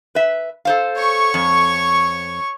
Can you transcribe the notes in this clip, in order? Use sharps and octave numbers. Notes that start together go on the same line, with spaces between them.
B4 E5
A4 C5 F5
C#5 C#6
F2